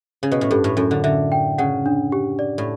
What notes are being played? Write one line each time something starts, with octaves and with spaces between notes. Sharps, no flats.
C#3
B2
A2
G2 A4
A2
F#2 A4
D3
D3 E5
G5
C#3 F#5
D4
G4
D5
A2